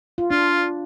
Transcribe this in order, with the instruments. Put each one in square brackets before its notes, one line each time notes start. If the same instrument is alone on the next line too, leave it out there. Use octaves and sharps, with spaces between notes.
[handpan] F4
[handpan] D4 [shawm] F4